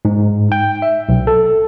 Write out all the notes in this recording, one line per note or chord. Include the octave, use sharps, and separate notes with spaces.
G#2
G5
E5
B1
A4